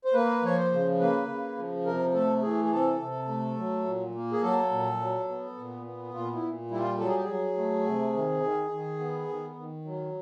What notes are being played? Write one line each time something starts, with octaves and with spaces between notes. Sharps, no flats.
C5
A#3 B4
F3 C#5
C5
C#3
A#3 B4
C#3
F3
C3 A#4
A3 A4
E3 G#4
G#4
C3 A4
C3
A3
F#3
A#2
A#3
G#4
F#3 A4
A#2
F#3
B3
A#2
B3
A#2 F4
E4
A#2
G3 E4
F4
F#3 A4
G#4
G4
F#3 G#4
A3
C3
D#3
D#3
D#3
B3
D#3
D#3
F#3